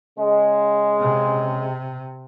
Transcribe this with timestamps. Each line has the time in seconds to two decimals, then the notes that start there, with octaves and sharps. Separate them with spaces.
0.18 C#3 G#3
1.00 C3